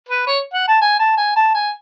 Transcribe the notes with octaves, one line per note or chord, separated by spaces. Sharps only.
B4
C#5
F#5
A5
G#5
A5
G#5
A5
G#5